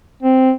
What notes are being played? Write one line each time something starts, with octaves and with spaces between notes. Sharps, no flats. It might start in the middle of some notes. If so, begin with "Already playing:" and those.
C4